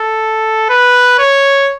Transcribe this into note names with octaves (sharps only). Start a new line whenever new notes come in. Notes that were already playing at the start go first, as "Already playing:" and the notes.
Already playing: A4
B4
C#5